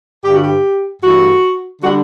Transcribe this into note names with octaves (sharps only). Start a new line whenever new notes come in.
G2 D3 G3 G4
F#4
G4
G2 E3 A3 E4 F#4
D3 G3 D4 F#4